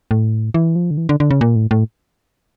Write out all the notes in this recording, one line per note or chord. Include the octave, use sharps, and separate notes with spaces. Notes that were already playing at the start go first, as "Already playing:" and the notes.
A2
E3
F3
D3
E3
D3
D3
C#3
A#2
A2
A2